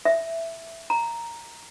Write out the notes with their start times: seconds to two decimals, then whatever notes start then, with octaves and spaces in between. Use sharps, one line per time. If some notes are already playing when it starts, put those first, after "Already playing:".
0.05 E5
0.90 A#5